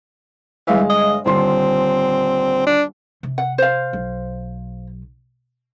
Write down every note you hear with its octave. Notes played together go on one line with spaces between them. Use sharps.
G1 E3 G#3 F5
D#5
D#1 D3 C4 C6
D4
C3
F#5
C5 F5
B1